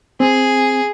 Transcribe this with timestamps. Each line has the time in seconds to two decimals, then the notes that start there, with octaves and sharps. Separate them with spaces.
0.20 C4 G#4